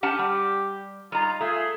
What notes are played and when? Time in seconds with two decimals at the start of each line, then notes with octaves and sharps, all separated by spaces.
0.03 C#4 G4 F#5 A5
0.19 G3
1.12 G3 D#4 F4 A#5
1.41 A3 F4 G#4